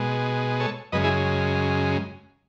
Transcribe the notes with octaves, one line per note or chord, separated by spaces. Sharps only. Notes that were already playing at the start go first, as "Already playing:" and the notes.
Already playing: B2 G#3
A4 C#5
F#2 C#3 G#3 B4 D#5
E4 G#4